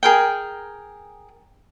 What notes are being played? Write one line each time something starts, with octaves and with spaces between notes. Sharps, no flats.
G#4 A#4 G5